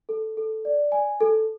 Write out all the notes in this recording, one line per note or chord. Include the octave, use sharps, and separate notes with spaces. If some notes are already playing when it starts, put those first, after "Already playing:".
A4
A4
D5
G#5
A4